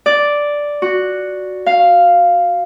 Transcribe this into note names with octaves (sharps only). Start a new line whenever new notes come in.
D5
F#4
F5